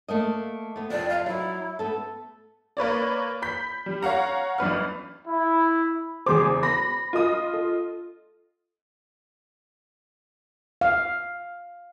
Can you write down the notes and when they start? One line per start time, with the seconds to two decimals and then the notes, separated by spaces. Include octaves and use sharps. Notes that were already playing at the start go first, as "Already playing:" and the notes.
0.08 A3 A#3 D#5
0.76 A3 B3
0.90 F2 A2 C3 D5
1.08 F5
1.26 F#3 D#4 E4
1.79 A3 B3 A4
2.77 A#3 B4 C#5 D5
3.42 B5 G6 B6
3.86 G3
4.03 C#5 F5 F#5 A#5
4.58 G1 F#2 B4 F6
5.28 E4
6.26 E2 C#3 G#4 C5 D6
6.63 B5 A#6
7.13 F4 D#5 D#6
7.54 A4
10.81 F5